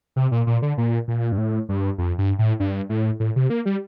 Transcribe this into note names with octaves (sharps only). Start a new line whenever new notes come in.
C3
A#2
A#2
D3
A#2
A#2
G2
A2
G2
F2
G2
A2
G2
A2
A2
C3
A#3
G3